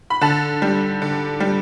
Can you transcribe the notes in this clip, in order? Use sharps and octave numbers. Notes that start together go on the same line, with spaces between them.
B5
D3 A5
G3
D3
G3